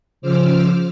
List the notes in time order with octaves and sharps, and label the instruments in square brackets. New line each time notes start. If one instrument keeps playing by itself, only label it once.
[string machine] C#3 F3 C5 D6 E6 F6